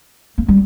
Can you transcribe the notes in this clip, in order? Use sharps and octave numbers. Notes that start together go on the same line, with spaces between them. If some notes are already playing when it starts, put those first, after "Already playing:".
A#3
G3